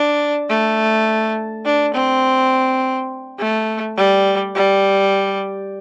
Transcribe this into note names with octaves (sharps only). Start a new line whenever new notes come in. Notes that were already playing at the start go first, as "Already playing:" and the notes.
Already playing: D4
A3
D4
C4
A3
G3
G3